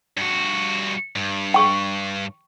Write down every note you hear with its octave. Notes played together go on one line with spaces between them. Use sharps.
G2 F#4
G2
G5 C#6